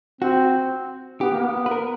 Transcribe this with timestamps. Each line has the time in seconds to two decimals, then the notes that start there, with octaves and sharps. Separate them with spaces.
0.21 C4 F#4
1.21 B3 G4
1.32 A#3
1.42 B3
1.66 B4
1.71 A#4